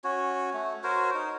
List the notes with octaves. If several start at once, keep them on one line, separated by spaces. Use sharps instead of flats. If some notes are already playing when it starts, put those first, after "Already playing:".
C#4 F#4 C#5
A3
F#4 A#4 C5 C#5
D#4